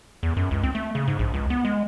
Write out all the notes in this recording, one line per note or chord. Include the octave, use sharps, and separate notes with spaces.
E2
F#2
C#2
C4
A3
C#3
G#2
A#1
C#2
B3
G#3